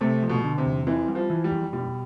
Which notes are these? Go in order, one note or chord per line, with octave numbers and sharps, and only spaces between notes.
C3 A3
F3
B2
D3
C3
E2
E3 C4
G3
F3
E3
G3
F2
B2 G3